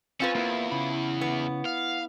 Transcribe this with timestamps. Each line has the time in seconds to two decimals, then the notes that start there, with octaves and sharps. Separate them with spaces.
0.20 C4 C#4 F4 B4
0.35 E2 A#3 E4
0.71 C#3 E4 B5
1.21 B3
1.65 F5